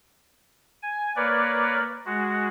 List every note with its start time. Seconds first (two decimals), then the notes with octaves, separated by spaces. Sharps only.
0.82 G#5
1.16 A#3 A#4 B4 C#5 D5
2.05 G#3 F#4